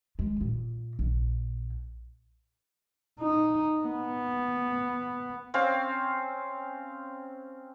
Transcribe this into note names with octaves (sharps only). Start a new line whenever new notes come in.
G#3
A#2
A#1
D#4
B3
C4 C#4 F5